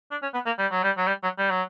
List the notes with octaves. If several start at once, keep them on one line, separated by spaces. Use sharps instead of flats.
D4
C#4
B3
A#3
G3
F#3
G3
F#3
G3
F#3
G3
F#3